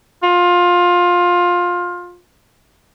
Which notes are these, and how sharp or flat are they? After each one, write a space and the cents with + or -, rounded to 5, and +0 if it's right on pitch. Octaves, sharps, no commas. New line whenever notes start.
F4 +20